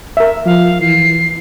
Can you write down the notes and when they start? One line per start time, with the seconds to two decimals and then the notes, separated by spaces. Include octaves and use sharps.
0.17 A#4 E5
0.46 F3 F5
0.81 E3 C7